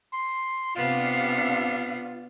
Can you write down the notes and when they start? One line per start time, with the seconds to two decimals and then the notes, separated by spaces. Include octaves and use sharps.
0.13 C6
0.76 C3 B3 D4 F4 F5